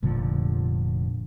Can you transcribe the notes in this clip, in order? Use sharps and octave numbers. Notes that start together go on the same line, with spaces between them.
F1 A#2 D3 F3